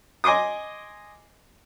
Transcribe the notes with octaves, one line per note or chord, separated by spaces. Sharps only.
D#5 G#5 C6 D6 D#6